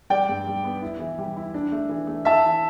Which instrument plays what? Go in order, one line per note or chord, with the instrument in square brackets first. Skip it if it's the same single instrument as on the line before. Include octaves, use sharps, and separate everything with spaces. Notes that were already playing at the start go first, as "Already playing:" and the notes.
[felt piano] G3 [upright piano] D5 G5
[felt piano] G2
G3
B3
E4
E3
G3
E4
D4
A3
E3
A3
[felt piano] E3 [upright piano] E5 A5
[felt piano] E3